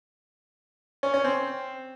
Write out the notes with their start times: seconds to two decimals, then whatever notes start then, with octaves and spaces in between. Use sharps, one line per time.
1.03 C#4
1.14 C#4
1.24 C4